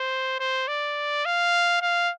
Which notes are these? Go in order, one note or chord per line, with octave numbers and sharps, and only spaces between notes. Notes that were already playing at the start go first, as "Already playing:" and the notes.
Already playing: C5
C5
D5
F5
F5